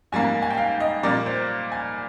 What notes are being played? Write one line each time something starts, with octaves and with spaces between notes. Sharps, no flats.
G#2 G3 A#3 G#5
G#5
G5
F5
D#5
A#2 G3 A#3 D5
C5
G#5